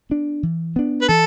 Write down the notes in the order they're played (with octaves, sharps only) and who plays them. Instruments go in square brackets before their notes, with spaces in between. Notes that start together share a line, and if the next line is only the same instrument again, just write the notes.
[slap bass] B3 D4
E3
B3 D4
[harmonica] B4
[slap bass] E3 [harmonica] A4